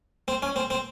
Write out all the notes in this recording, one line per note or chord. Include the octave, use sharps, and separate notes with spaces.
C4
C#4
C4
C4